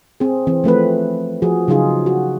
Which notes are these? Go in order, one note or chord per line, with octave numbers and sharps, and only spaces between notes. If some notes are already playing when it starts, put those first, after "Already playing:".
C4 G#4
E3 C4
F3 A3 C4 B4
F3 F#4 G#4
C#3 F#3 D#4 F4 G#4
F#4